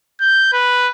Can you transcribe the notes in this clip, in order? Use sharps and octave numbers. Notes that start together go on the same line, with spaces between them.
G6
B4